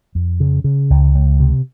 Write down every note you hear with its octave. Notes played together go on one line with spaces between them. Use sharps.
F2
C#3
C#3
C#2
C#2
C3